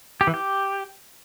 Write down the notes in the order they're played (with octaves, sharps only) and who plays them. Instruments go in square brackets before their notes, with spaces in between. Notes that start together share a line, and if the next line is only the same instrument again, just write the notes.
[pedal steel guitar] G4
E3
G4